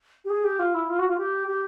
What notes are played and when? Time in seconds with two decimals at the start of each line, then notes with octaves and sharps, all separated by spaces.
0.25 G4
0.30 G#4
0.44 G4
0.59 F4
0.74 E4
0.90 F4
0.99 F#4
1.08 F4
1.18 G4
1.48 G4